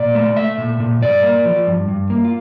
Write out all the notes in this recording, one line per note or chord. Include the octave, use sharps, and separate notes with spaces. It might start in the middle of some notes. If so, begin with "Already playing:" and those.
Already playing: A#2 D5
A3
A3 E5
A#2
A#2
G2 D5
A#3
F3
G2
G2
A#3
F4